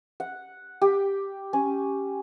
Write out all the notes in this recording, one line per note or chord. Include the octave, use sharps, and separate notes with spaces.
F#5
G4
C#4